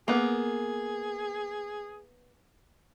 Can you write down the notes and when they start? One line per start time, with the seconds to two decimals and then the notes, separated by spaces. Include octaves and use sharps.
0.08 A#3 B3 G#4